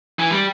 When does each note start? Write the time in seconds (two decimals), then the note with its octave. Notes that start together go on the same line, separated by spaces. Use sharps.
0.19 E3
0.32 G3